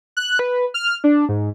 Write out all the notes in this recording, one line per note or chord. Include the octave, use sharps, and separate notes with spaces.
F#6
B4
F6
D4
G#2